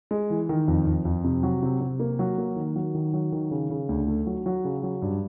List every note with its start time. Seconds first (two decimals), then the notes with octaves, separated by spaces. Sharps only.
0.11 G#3
0.30 E3
0.49 D#3
0.68 F2
0.86 F2
1.05 F2
1.24 C3
1.43 F#3
1.62 C3
1.81 C3
2.00 A#3
2.19 F#3
2.38 A#3
2.56 D#3
2.76 F#3
2.95 D#3
3.14 F#3
3.32 D#3
3.51 C#3
3.70 C#3
3.89 D2
4.07 A3
4.27 F#3
4.46 F#3
4.65 C#3
4.83 F#3
5.02 G2